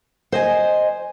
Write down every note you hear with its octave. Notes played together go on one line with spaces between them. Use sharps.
C5 D#5 G#5